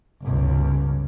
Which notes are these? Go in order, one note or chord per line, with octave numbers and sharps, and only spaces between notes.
G1 C#2